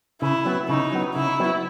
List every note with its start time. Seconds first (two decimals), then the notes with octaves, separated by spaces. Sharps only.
0.22 C#3 E4
0.45 F#3 B3
0.68 C#3 D#4
0.92 F#3 B3
1.15 C#3 E4
1.39 F#3 B3